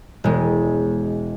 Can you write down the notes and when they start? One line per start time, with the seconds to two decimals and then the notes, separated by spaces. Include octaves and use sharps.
0.24 E1 G#3